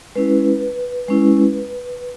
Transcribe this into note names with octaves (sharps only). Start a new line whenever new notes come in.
G#3 C#4 E4 B4
G#3 C#4 E4